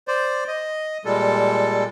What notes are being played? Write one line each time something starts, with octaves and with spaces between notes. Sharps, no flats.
C5 D5
D#5
A#2 G3 G#3 A4